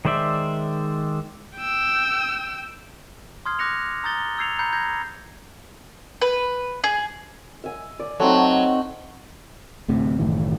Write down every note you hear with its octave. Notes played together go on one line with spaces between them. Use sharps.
D#3 G#3 C5 D5 E5
G5 E6
C6 D#6 F6 G#6 C7
D6 F#6 A#6 C#7 F7
A#5 D#6 G6 A6 G7
E6 G6 G#6 C7 C#7 F7
A#5 B5 F#6 G6 C7 C#7
G6 G#6 A#6 C7
B4
G#4
E5 G#5
D5
F#3 A3 C4 D#4
D2 A2 C3
F#1 A2 D#3 E3